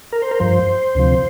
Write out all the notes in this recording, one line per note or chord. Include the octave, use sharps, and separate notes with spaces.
A#4
C5
A#4
G2 F3 C5
D2 C3 F3